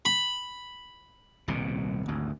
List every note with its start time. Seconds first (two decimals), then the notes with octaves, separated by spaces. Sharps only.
0.05 B5
1.48 D#1 C2 B2
2.08 G#1 D2